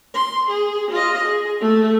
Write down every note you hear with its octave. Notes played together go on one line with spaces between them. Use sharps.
C6
G#4
F4 D#5
G#4
A3